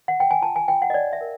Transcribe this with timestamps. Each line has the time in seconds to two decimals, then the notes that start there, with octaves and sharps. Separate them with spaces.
0.08 F#5
0.20 G5
0.31 G#5
0.42 F4 A5
0.56 G#5
0.68 F4 G5
0.82 F#5
0.90 D#5
0.94 C#5 D5
1.13 E5
1.21 A#4